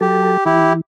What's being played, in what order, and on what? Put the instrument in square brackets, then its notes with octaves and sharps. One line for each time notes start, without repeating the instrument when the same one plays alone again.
[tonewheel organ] F#3 A4 [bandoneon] G4
[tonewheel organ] E3 [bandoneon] E4 G4